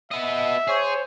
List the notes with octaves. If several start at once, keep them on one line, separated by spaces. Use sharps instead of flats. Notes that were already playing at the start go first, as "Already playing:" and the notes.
B3 D#5 E5
G#4 C5 C#5